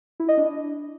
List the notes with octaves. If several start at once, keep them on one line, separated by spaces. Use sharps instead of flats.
E4
D#5
D4